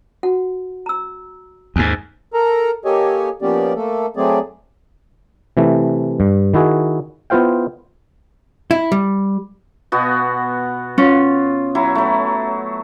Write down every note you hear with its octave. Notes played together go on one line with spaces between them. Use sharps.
F#4 F#5
A#5 E6
D#2 G#2 G#5
A4 A#4 A#5
A#3 G4 A4 C#5 D#5 G#5
F3 A#3 B3 C#4 G4 D5
A3 A#3 A4
F#3 A3 C4 G#4 D5
C3 E3 A3
G2
D#3 E4 F#4 G#4
B3 E4 F4 C5 F5 G5
E4
G3
B2 B3 F#4
C#4 F4
F#3 E4
F#3 A3